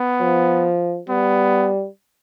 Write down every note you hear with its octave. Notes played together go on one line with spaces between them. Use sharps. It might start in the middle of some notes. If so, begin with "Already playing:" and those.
Already playing: B3
F3
G3 B3